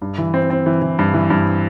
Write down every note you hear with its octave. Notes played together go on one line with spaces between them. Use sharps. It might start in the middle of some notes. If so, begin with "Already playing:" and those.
G2
E3
C4
C4
E3
E3
G2
E3
G2